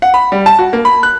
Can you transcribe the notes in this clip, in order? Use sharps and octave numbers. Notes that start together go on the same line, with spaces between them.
F#5
B5
G3
A5
F#4
A#3
B5
F#6